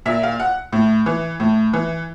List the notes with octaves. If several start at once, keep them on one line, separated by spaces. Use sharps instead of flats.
A#2 E5
F5
F#5
A2
E3
A2
E3